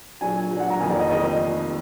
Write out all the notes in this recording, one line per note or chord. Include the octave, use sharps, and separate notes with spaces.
A#2 F#3 D4 G#5
A#2 F#3 D4
F#5
A#5
F1 F2 D#3 A#3 D#4 G#5
D5
D#5
F1 F2 D#3 A#3 D#4 D#5